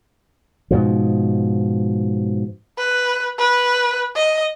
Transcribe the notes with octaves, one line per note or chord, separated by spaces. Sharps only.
G#2 B2 F3
B4
B4
D#5